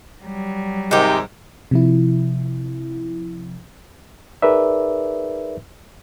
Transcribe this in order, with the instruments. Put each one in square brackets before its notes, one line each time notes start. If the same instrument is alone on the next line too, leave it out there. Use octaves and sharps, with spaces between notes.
[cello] F#3 G3
[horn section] G#2 C3 D#3 [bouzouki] D#4 G4
[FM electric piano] C3 F3 E4
[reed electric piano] D#4 G#4 A#4 B4 D5 E5